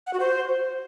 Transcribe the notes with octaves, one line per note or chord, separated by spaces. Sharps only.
F#5
F#4
C5